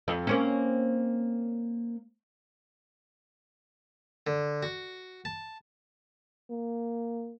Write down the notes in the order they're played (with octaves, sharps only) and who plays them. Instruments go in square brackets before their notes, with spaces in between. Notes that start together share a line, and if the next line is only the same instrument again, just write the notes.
[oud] F2
A#3 C4 C#4
[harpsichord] D3
F#4
A5
[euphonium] A#3